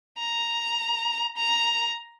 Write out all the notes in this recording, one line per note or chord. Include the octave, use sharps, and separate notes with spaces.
A#5
A#5